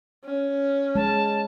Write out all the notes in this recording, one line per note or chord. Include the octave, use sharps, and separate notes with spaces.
C#4
G#3 A5